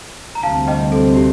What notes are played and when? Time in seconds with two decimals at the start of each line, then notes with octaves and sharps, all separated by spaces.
0.35 A#5
0.43 D2 C3 G3 C4 F5 A5
0.67 D#5 G5
0.92 A4
1.16 G4